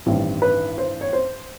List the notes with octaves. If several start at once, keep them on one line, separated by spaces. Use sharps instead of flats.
A1 G2 D#3 G3 C4
B4
C5
C#5
C5